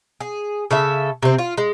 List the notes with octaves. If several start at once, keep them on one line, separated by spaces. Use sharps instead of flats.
G#4
C#3 A4 E5
C3 C4
F4
G#3